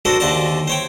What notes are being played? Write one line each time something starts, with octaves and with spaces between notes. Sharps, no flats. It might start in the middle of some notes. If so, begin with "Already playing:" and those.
D4 F#4 A4 A#4 C5
D#2 D3 C5 D5 A5
C5 C#5 G5